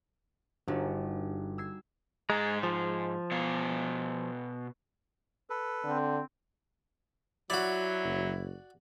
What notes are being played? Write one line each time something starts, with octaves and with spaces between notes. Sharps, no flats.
G1 G2 D#4 F#4
E6 G#6 C7
G#2 G#3 A#5
F3
B2 B3 F5
A4 B4
D3 C4
F#3 E4 F#4 D5
F#1